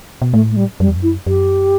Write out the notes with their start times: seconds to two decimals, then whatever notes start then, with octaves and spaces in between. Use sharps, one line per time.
0.22 B2
0.33 A2 A3
0.51 A3
0.56 G3
0.80 F#2 G3
0.88 E2
0.96 F#2
1.03 E4
1.27 F#2 G4